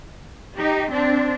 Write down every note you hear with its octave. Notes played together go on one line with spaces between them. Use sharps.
D#4 G4
C4 D4